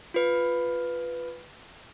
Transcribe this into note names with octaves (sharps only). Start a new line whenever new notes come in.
F4 B4